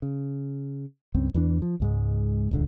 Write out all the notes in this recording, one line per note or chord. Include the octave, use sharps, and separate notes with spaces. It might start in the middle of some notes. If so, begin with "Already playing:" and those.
C#3
C#2 G2 C#3 C4
E2 E3 C4 D4
F3
C#2 G#2 G#3
D#1 C#2 D3